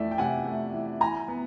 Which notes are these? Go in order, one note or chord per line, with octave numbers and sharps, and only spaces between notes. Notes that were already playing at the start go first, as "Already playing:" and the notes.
Already playing: F2 E3 A3 D5 E5
G5
C3 F#5 G#5
A3
E3
E3 G#5 A#5
B3